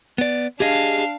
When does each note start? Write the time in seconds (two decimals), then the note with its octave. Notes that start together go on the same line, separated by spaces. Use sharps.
0.18 B3 D5
0.60 D4 G4 G#4 D#5 F5